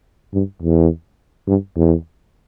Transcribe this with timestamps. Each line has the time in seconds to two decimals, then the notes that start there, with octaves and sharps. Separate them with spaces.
0.33 G2
0.62 E2
1.47 G2
1.76 E2